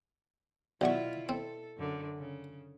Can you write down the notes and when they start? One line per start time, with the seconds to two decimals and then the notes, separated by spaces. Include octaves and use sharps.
0.81 B1 B2 E4 F4 D5 E5 F#5 C#6
1.29 C4 A4
1.77 F#2 D3
2.18 C#3